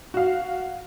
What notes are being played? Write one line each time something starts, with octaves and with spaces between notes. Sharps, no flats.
F#4 F5